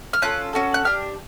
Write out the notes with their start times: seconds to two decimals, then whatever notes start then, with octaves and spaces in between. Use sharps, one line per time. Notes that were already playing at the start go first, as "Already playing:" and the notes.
0.13 F6
0.22 C#4 F4 A4 F#6
0.53 C#4 F#4 A4
0.74 F#6
0.85 D4 G4 F6